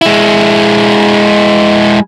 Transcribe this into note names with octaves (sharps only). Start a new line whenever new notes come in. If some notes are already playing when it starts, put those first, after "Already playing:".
G#3 E4